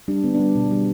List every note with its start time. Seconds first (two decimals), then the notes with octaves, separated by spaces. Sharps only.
0.08 G3 D4
0.24 D3 B3
0.35 D4
0.40 G3
0.55 B2
0.71 G3